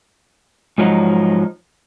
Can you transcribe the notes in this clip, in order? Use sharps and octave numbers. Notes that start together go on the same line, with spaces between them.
G#2 F3 F#3 D#4